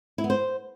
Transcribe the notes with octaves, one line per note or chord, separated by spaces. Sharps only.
E4
B3
C5